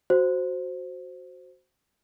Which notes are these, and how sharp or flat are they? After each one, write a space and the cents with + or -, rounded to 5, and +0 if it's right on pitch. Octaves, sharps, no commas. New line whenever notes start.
F#4 +0 C5 +0